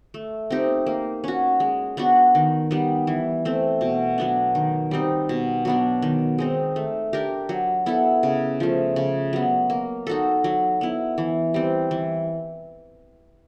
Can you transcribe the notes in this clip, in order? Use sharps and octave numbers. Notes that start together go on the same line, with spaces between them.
A3
C4 D#4 G4
A#3
C#4 F#4
G#3
B3 D4 F#4
D#3
G3 B3 D#4
E3
A3 C4
B2
F#3 B3 D4
D#3
G3 C4 D#4
B2
F#3 B3 D4
D#3
G#3 C4 D#4
A3
D4 G4 A#4
F#3
B3 E4 A4
C#3
F3 A3
C#3
F#3 B3
A#3
D#4 F#4 A4
F#3
B3 E4
E3
G3 C4
E3